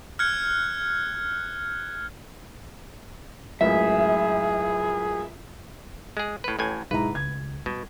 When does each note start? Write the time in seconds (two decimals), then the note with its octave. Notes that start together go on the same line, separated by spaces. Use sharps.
0.19 F6 F#6 G#6 C#7
3.61 C#2 F#2 A2 G#4 E5
6.17 G#3 G#4
6.44 A2 B4
6.59 A1 A2 G#5
6.91 B1 G#2 E4 B4 A#5
7.15 C#2 G#6
7.66 B2 G3